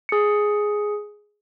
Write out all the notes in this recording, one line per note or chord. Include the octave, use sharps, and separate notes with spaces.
G#4 C#7